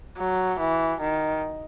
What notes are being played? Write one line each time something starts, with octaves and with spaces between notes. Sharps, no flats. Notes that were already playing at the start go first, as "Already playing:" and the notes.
F#3
E3
D#3